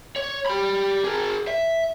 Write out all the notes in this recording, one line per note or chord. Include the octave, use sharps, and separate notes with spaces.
C#5
G4 B5
G#4 A#4
E5